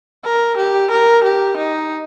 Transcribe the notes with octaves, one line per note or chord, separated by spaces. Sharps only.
A#4
G4
A#4
G4
D#4